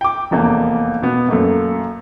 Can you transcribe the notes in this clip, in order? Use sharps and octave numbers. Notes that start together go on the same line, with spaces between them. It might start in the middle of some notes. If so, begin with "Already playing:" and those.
G5 D6
F1 E2 A#3
B2 B3
F#2 A3 A#3